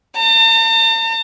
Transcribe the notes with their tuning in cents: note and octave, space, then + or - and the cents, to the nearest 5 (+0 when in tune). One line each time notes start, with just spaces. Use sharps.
A5 +45